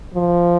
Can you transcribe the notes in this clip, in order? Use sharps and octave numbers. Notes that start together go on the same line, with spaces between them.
F3